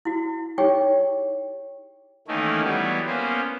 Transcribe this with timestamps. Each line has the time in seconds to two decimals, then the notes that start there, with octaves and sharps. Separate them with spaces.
0.05 E4 F#4
0.58 D#4 G4 G#4 C#5 G5
2.28 D#3 E3 A3 A#3 C#4 D#4
2.64 E3 F#3 G3 B3
3.06 A#3 B3 C#4 C5